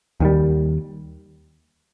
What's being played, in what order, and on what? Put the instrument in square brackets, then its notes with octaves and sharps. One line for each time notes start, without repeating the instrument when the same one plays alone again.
[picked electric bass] D#2 D#3 G3